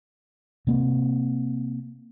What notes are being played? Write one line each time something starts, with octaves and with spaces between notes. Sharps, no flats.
C3 A#3 C4